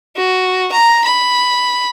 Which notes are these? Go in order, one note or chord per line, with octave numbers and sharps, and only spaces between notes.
F#4
A#5
B5